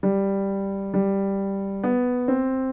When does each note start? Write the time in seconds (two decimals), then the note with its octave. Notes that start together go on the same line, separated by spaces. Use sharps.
0.03 G3
0.94 G3
1.84 B3
2.28 C4